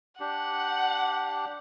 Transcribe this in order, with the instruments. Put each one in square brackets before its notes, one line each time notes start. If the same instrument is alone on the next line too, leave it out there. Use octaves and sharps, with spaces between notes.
[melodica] D4 G4 [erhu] F#5